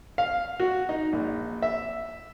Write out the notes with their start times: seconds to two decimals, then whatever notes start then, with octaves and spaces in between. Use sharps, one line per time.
0.18 F5
0.60 F#4
0.89 D#4
1.13 A#1
1.62 E5